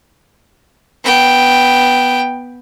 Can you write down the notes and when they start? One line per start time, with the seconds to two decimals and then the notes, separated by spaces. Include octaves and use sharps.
1.04 B3 G5